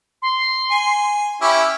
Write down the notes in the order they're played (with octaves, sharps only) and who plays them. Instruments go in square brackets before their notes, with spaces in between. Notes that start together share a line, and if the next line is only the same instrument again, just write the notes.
[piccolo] C6
[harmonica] G#5
[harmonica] C#4 E4 G4 [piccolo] E6